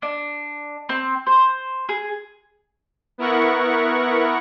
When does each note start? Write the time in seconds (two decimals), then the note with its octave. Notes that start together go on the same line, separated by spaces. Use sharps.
0.02 D4
0.89 C4
1.26 C5
1.89 G#4
3.18 B3 E4 A#4 F#5 C#6